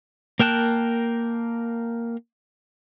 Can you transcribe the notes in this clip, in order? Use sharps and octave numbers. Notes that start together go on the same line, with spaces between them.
A#3 A#4 G5 A5 F#6